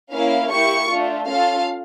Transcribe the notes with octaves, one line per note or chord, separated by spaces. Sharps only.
A#3 C#4 E4 F5
A#3 E4 G4 C#6
A3 D4 F4
C#4 F4 A4 F5